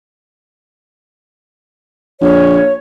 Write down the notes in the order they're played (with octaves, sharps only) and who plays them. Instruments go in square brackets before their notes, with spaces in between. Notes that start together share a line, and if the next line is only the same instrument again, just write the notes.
[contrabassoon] A#1 [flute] C#5